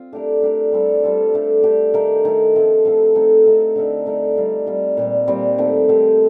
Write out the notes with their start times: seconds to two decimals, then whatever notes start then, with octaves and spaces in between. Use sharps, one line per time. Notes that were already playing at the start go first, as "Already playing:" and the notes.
Already playing: C4 F4
0.13 A3 D4 G4 A#4
0.42 A3 D4 G4 A#4
0.72 G3 C4 F4 A4
1.03 G3 C4 F4 A4
1.34 A3 D4 G4
1.63 A3 D4 G4
1.94 D#3 A3 D#4 A#4
2.25 D#3 A3 D#4 A#4
2.54 F3 A3 C4 F4
2.85 F3 A3 C4 F4
3.15 A3 C4 D#4 A4
3.46 A3 C4 D#4 A4
3.75 D3 A3 D#4 A#4
4.06 D3 A3 D#4 A#4
4.37 G3 C4 F4
4.66 G3 C4 F4
4.97 A#2 G3 C4
5.28 A#2 G3 C4
5.58 D#3 A3 C4 G4
5.88 D#3 A3 C4 G4